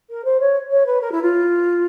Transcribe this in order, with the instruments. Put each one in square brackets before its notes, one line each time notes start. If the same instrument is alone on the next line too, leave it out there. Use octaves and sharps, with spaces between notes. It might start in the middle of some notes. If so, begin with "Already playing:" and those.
[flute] A#4
C5
C#5
C#5
B4
A#4
E4
F4